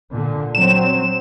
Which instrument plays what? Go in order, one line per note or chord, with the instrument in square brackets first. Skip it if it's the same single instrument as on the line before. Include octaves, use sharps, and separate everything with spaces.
[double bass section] A#2 D3
[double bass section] F#3 C4 [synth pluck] E7